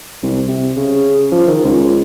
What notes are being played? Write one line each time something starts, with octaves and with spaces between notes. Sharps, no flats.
C2
C3
C#3
F3
D#3
C#2